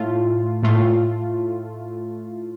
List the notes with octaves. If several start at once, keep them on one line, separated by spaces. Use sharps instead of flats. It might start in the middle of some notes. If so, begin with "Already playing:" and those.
Already playing: A2 A3 F4
A2 A3 F4